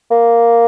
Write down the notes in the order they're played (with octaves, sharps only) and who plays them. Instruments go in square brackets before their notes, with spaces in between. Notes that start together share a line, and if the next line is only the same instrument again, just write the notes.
[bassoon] A#3